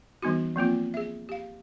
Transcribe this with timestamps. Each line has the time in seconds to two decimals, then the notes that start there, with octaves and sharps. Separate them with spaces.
0.22 E3 G3 B3 D#4 F#4
0.56 F3 A#3 C4 F4
0.94 G#4 E5
1.29 G4 F5